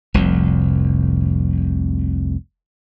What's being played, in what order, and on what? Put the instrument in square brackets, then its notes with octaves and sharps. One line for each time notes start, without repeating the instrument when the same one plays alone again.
[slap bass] F1 C2 F2